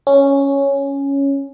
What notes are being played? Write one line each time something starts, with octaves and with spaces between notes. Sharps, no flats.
C#4